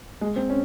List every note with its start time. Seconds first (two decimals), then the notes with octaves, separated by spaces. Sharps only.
0.21 G#3
0.36 C4
0.50 C#4